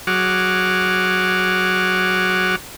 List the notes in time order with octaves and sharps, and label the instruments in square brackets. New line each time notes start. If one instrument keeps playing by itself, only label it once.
[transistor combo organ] F#3 F#4 G#4 F#5 D6 F6